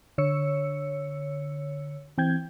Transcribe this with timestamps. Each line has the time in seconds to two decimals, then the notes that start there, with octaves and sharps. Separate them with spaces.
0.18 D3 C#5 E6 C#7
2.18 E3 C4 G5 G6 G#6